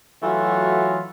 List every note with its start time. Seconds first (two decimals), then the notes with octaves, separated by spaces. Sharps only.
0.23 E3 F#3 A3 F4 F#4